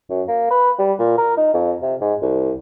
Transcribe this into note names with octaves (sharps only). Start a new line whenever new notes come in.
F#2
A#3
B4
G3
A#2
A#4
D#4
F2
C3
G#2
C2